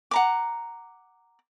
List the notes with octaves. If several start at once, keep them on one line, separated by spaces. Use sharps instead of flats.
F#5 A#5 D6